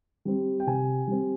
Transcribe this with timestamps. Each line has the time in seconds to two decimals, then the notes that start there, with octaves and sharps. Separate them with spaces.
0.25 G3 C4
0.60 G5
0.67 C3 G#5
1.07 G3 C4